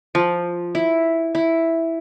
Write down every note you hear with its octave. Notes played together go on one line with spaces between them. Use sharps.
F3
E4
E4